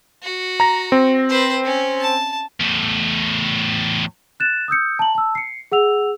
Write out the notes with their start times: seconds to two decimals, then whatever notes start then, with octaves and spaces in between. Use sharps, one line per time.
0.23 F#4
0.60 A#5 A#6
0.92 C4
1.30 B4 C5
1.65 C#4
2.01 A5
2.60 E2 A2
4.40 F#6 A6 E7
4.68 D#6 E6 G6 C#7
4.99 A5 A#5 F#7
5.15 A5 E6
5.35 C7 C#7
5.72 G#4 F#5 E6 F7